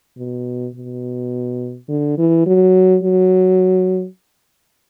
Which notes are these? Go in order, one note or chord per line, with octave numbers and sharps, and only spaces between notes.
B2
B2
D3
E3
F#3
F#3